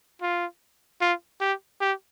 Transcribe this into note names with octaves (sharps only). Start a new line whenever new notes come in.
F4
F4
G4
G4